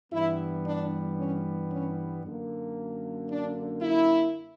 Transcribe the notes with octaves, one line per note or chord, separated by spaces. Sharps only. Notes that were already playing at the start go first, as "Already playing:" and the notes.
G2 E3 G3 B3 E4
D4
C#4
C#4
F#2 D3 A#3
D4
E4